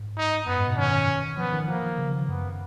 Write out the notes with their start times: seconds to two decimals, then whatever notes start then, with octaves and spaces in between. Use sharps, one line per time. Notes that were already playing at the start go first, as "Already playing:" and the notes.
Already playing: G#2
0.17 D#4
0.47 F#2 B3
0.57 G#2
0.67 B2
0.77 D#3 C#4
1.37 F3 B3
1.52 D#3
1.68 F3 A#3
1.83 D#3
1.98 C#3
2.28 F#2 B3